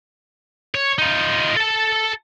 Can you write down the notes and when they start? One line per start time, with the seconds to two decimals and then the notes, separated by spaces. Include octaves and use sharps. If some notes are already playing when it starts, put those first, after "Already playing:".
0.75 C#5
0.98 D#4 F4
1.56 A4 A5